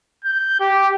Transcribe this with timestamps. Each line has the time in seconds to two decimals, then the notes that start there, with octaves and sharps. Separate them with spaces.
0.25 G6
0.60 G4